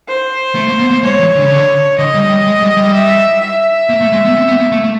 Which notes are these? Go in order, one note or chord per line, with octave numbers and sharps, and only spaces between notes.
C5
A3
A#3
B3
A#3
G#3 C#5
E3
D3
C#3
D3
D3 D#5
G3
G3
G#3
G3
G3
E5
E5
A#3
A3
G#3
B3
C4
B3
A#3
A3
A3